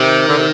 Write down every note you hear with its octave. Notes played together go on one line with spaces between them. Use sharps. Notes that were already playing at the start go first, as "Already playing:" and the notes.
Already playing: C3 D#3
D3
C3